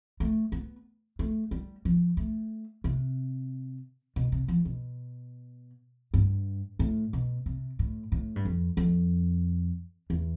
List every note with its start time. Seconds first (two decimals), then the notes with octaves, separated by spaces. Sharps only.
0.20 A3
0.52 B3
1.19 A3
1.51 G3
1.85 F3
2.17 A3
2.84 C3
4.16 B2
4.32 C3
4.48 F3
4.65 B2
6.14 G2
6.79 A2
7.13 B2
7.46 C3
7.79 A2
8.12 A2
8.36 G2
8.45 F2
8.77 F2
10.10 E2